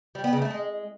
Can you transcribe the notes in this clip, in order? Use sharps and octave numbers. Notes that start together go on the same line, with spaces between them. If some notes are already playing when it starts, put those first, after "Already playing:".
G3
B3
C#3
A3
G#3